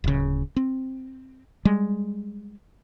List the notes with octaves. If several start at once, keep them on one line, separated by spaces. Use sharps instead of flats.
D1 C#3
C4
G3 G#3